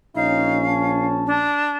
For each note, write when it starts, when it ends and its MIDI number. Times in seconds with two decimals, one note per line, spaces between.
0.16 1.45 34
0.16 1.45 61
0.16 0.61 63
0.16 1.06 77
0.68 1.47 81
1.27 1.77 62